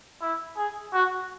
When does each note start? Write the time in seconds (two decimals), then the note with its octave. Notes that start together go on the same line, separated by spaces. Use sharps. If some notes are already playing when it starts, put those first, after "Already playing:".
0.22 E4
0.57 G#4
0.93 F#4